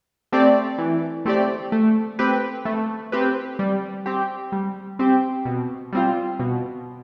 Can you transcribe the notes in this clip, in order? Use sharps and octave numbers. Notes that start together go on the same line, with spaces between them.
A3 C4 G4 D5
E3
A3 C4 G4 D5
A3
C4 G4 B4
A3
C4 G4 B4
G3
C4 G4
G3
C4 G4
B2
G3 C4 F4
B2